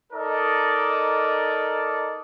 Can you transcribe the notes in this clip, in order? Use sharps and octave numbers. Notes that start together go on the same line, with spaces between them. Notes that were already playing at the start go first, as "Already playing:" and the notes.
D#4 A4 A#4 D5 D#5